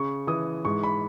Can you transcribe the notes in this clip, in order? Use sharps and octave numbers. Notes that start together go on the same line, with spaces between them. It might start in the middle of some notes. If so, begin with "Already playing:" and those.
Already playing: C#3 C#6
E3 D#6
G#2 C#6
B5